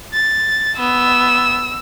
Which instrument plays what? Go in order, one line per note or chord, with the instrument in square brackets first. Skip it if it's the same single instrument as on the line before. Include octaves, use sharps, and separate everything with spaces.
[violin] A6
[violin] B3 [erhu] E6